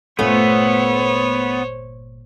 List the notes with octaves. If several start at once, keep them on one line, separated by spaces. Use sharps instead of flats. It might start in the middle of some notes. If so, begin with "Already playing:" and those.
G1 A#2 A3 B3 C#4 F4 C5 C#5